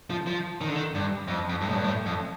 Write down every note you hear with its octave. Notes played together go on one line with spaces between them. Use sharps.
F3
F3
D#3
D3
D#3
G2
F2
F2
G2
A2
G2
A2
F2